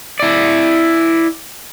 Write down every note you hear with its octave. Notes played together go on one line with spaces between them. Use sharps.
E4 D5